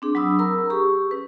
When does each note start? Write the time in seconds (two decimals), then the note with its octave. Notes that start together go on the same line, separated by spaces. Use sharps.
0.02 C4 D4 G#4
0.15 F#3 D4 B5 D#6 E6
0.39 A#4 A#5 E6
0.70 G4 G#4 C#6
1.11 C#4 B4